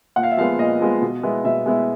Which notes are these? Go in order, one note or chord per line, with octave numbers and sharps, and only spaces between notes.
A#2 F#5
F5
E5
F3 G#3 B3 F5
A#2 D#5
F3 G#3 B3
B2
G#3 B3 E4
B2 E5
G#3 B3 E4